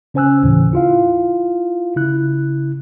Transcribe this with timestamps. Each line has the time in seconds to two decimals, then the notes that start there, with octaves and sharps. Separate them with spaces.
0.14 C#3 C#4 C5 G#5 E6 F#6
0.43 D#2 A2 C#3 E3
0.73 E4 F4 F5
1.96 C#3 E4 F#6